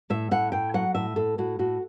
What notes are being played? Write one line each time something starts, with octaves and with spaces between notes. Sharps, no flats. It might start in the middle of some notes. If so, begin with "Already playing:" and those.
A2 E5
A2 F#5
A2 G5
F#3 F#5
A2 E5
A2 A4
A2 F#4
A2 F#4